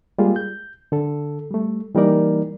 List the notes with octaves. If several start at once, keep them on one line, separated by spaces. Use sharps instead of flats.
G3 G#3 A#3 F4 G#4
G6
D3 A4
G3 A3
E3 G3 A#3 D#4 A#4 D5